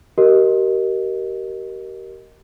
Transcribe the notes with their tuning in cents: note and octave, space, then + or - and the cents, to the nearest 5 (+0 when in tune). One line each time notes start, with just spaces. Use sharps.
G4 -35 A#4 +0 D#5 +0